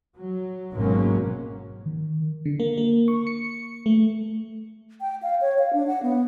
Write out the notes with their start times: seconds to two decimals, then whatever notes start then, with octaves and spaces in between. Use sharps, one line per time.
0.16 F#3
0.72 G#1 B2 F#3 G#3 A#3 C#4
1.86 D#3
2.46 D3
2.60 A#3
2.77 A#3
3.08 C#6
3.27 C#7
3.86 A3
5.01 G5
5.23 F5
5.41 C#5
5.59 F5
5.73 D4
5.87 F#5
6.03 B3